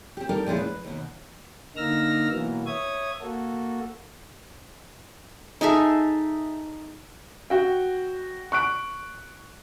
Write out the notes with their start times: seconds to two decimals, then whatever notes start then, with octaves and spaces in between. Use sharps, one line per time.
0.17 C4 G4
0.29 G3 D#4 G4 A4 A#4
0.46 A#2 F3 G#3 C#4 E4
0.59 B4
0.84 D#2 B2
1.76 D3 A#3 D#4 E6 F6 A#6
2.31 B2 E3 F#3 A#3 B3
2.66 C#5 E5 D#6 G#6
3.21 A#3 F#4 A4
5.61 D#4 G#4 A4 E5
7.50 F#4 G5
8.52 C#6 F#6 D7